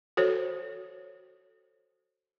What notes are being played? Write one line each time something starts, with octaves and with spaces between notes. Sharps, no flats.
F#4 A4 C5 C#5